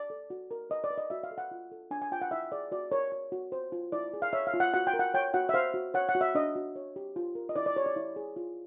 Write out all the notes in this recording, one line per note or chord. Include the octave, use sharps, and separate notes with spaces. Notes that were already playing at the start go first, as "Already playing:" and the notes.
Already playing: D5
A4
F#4
A#4
B4 D#5
D5
B4
D#5
F#4 E5
F5
A4
F#5
F4
A4
D4 G#5
G#5
F4 G5
F#5
E4 E5
G#4 D5
F#4 D5
A#4 C#5
C#5
F#4
C5
F4
E4 D5
G#4
F5
C#5 E5
F5
F4
F#5
F#4 F#5
G5
A#4
F#5
C#5 G5
F#4 F#5
E5
C5 F5
F#4
C#5 F#5
F#5
F#4
E5
D4 D#5
F#4
C#5
G4
F4
A#4
D#5
E4 D5
D5
G4 C#5
D5
E4
G#4
F4